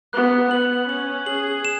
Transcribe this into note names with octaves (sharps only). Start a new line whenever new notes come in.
B3 F#6
B3 F#7
C#4 F#7
G#4 F#7
E7